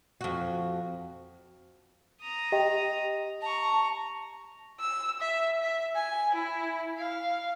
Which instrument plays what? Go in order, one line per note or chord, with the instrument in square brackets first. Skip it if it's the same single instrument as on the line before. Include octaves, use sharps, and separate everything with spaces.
[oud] F2 F#4
[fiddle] A#5 D#6
[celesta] G4 D#5 G5
[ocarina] A5 [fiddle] A#5 C#6
[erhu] E6
E5
E5
G#5
E4
F5